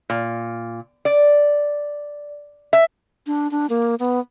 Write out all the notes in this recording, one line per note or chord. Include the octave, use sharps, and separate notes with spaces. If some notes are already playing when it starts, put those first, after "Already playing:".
A#2
D5
E5
D4
D4
A#3
B3